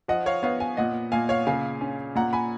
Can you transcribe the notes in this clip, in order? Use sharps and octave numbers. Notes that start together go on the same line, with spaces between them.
F3 D#5 F#5
C#5 F5
B3 C#5 F5
F5 G#5
A#2 D#5 F#5
A#2 F5 G#5
C#5 F5
C#3 F5 G#5
C#4
A#2 F#5 A#5
G#5 B5